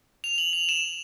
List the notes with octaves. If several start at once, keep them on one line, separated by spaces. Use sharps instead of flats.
F7
F#7
F7
E7